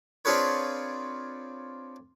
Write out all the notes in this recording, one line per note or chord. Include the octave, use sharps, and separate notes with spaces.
C4 D4 F4 G#4 B4 C#5